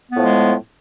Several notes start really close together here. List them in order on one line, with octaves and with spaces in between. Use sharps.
B3 A2 F3 G#3